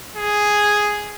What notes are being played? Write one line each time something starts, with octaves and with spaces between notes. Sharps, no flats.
G#4